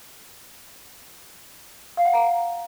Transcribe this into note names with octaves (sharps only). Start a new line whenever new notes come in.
F5
F#5
A#5